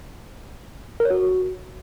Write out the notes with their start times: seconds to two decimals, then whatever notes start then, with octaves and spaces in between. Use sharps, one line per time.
1.00 A#4
1.05 C#5
1.10 F#4